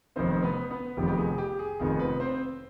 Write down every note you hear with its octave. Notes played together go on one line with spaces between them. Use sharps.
F1 F2 D#3 B3 C4 C5
B3 B4
B3 B4
F1 F2 D#3 B3 G4
G4
G#4
G4
G#4
F1 F2 D#3 B3 G#4
B3 B4
C4 C5